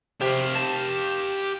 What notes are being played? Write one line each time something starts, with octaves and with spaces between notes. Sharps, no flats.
C3 G4 F5
A5